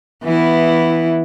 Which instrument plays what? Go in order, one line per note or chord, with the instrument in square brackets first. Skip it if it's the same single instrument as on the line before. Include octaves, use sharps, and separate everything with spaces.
[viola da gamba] E3 B3 E4